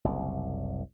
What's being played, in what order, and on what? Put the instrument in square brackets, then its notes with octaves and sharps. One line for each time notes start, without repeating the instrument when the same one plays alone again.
[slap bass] F#1 C2